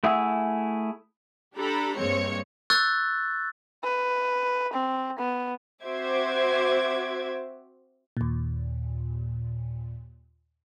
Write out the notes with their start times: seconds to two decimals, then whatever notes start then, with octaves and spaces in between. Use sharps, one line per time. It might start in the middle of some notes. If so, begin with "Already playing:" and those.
0.04 A3 E4 G#4 F#5 E6
1.56 D4 G4 A4 A#5 B5
1.97 G2 G#3 A#3 C4 C#5 C#7
2.70 C#6 E6 F#6 G6 A6
3.83 B4
4.73 C4
5.18 B3
5.84 C4 F#4 C5 E5 D6 G#6
8.17 D#2 A#2